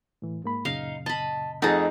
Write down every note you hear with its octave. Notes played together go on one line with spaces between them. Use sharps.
A2 E3
G#2 A#3 B5
F#2 A#2 C#3 D#4 F5
D#5 A5 B5
F2 A3 D#4 G#4 F#5 A5 A#5